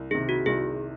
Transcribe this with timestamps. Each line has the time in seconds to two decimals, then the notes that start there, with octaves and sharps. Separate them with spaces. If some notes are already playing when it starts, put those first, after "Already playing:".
Already playing: C2
0.11 C3 D#3 G#4
0.29 F#4
0.46 C2 G#4